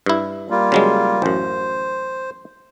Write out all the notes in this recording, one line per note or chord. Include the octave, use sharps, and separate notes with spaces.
G2 E4
G3 A#3 F4
C#3 F#3 G#3
A1 F#2 C5